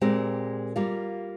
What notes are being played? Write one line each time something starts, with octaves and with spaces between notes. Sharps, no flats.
A#2 G#3 C4 G4 A#4
G3 A#3 F4